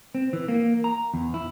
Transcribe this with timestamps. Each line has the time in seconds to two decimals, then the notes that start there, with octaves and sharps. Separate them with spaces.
0.15 C4
0.33 E3
0.48 A#3
0.84 A#5
1.14 E2
1.34 E4